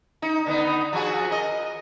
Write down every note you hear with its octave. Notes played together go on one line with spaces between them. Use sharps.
D#4
D3 B3 D#4
F3 F#4 G#4
A#4 D#5